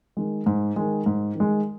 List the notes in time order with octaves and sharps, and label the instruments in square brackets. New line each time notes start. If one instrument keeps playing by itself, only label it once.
[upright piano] D#3 G#3
G#2
D#3 G#3
G#2
D#3 G#3